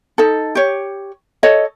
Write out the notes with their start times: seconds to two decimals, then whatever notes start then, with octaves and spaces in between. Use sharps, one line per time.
0.18 D#4 A4
0.55 G4 C#5
1.43 A4 C#5 D#5